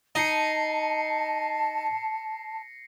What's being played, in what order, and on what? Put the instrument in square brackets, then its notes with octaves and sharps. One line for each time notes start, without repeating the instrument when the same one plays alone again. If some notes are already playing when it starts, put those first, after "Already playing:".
[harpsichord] D#4 [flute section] A5 [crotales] A#6 C7 C#7